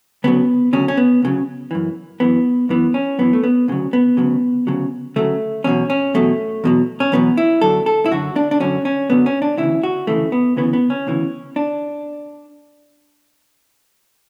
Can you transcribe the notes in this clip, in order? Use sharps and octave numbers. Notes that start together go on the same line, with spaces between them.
D2 C#3 F#3 B3
D2 C#3 F#3 C#4
C#4
B3
D2 C#3 F#3
F#2 E3
F#2 E3 B3
F#2 E3 B3
C#4
F#2 E3 B3
A3
B3
D2 C#3 F#3
B3
D2 C#3 F#3
D2 C#3 F#3
D2 C#3 F#3 A3
E2 B2 F#3 C#4
C#4
E2 B2 F#3 A3
E2 B2 F#3
C#4
E2 B2 F#3 B3
E4
F#2 D3 F#3 A4
A4
E4
F#2 D3 F#3 F#4
D4
D4
F#2 D3 F#3 C#4
C#4
F#2 D3 F#3 B3
C#4
D4
D2 C#3 E3 E4
F#4
D2 C#3 E3 A3
B3
D2 C#3 E3 B3
B3
C#4
D2 C#3 E3
D4